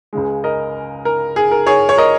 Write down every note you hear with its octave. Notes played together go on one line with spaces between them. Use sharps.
C#2 C#3 G#3
A#4 D#5
A#4
G#4
A#4
G#4 C#5
C#5
A#4 D#5